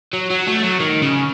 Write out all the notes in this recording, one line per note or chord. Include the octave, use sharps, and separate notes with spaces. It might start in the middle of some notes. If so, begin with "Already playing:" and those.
F#3
F#3
A3
F#3
D#3
C#3